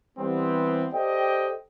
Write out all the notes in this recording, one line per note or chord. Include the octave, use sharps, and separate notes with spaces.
E3 G3 B3 C4
G4 A4 C5 D5 D#5 G5